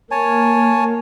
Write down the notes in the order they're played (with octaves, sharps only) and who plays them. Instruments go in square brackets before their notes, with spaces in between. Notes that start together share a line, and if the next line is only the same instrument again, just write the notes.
[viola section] A#3 [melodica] C#5 G#5 A5